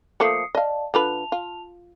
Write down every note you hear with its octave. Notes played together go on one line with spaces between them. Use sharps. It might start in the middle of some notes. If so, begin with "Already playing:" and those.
F3 A3 A#3 D#6 C7 C#7
D5 D#5 F5 A5
D3 F4 B4 A5 F7
F4